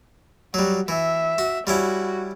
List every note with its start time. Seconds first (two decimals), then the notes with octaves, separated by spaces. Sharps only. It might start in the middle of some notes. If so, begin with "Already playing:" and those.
0.54 F#3 G3 F#4
0.88 E3 E5
1.38 F#4
1.67 G3 C#4 E4 F#4